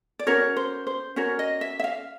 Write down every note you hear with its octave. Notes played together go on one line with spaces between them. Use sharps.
D5
C#4 F#4 A#4 C#5
C5
C5
C#4 F#4 A#4 C#5
D#5
E5
E5
F5